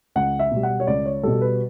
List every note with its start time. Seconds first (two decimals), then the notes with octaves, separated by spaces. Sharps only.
0.16 C#2 F#5
0.39 E5
0.52 B2 G3
0.63 F#5
0.80 C#5
0.87 C#2 D5
1.06 C#5
1.23 B2 G3 A4
1.41 B4